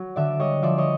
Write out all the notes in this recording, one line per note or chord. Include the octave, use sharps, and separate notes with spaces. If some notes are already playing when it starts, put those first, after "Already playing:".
Already playing: F#3
D3 D5 E5
G3 C#5 D#5
F3 D5 E5
C#5 D#5